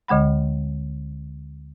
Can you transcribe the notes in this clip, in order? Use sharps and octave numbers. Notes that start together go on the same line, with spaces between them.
D2 D3 G#3 F#5 B5